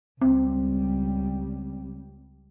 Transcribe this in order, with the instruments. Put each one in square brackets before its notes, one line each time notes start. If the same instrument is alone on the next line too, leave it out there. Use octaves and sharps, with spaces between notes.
[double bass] C#2 G3 [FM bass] C4